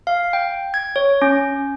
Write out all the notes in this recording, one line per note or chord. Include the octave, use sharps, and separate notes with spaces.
F5
G5
G#6
C#5
C#4